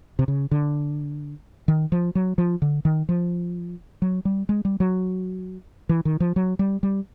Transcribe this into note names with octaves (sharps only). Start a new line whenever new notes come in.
C3
C#3
D3
D#3
F3
F#3
F3
D3
D#3
F3
F#3
G3
G#3
G3
F#3
E3
D#3
F3
F#3
G3
G3